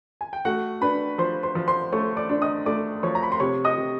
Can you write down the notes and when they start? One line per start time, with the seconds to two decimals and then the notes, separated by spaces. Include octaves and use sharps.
0.21 G#5
0.33 G5
0.45 A3 F#4 F#5
0.81 D4 B4 B5
1.18 F3 C5 C6
1.43 C5 C6
1.55 F3
1.68 C5 C6
1.92 A3 C#5 C#6
2.17 D5 D6
2.29 D4
2.42 D#5 D#6
2.66 A3 D5 D6
3.03 F3 C#5 C#6
3.15 A#5
3.23 B5
3.32 C6
3.40 C3 C#5 C#6
3.65 D#5 D#6
3.77 C3